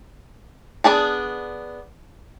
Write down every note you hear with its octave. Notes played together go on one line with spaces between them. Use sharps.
B3 D4 G#4 A5